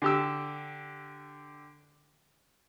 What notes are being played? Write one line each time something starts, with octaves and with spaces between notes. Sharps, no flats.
D3 G4 E6